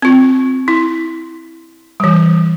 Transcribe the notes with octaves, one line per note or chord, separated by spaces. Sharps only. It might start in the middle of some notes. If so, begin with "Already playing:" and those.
C4 F4
E4
E3 G3